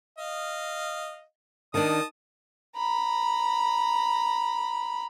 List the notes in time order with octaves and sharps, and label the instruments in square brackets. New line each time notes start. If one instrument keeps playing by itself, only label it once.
[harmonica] D#5 F5
[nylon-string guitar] D#3 D4 [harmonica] D#5 A5 D#6
[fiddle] A#5 B5